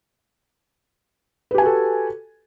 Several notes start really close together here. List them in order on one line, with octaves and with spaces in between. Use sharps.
B4 G4 G#5 F#4 A4